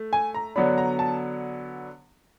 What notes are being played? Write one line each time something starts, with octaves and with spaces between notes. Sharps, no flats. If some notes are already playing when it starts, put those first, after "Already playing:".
Already playing: A3
G#5
A#5
D3 F#3 B3 D4 B5
A#5
A5